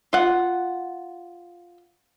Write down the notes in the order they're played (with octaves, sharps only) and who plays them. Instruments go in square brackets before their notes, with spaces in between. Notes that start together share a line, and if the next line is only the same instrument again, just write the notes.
[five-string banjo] F4 F#5